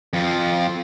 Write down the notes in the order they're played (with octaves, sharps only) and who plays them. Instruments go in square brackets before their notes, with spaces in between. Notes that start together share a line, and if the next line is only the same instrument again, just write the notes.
[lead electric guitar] F2 F3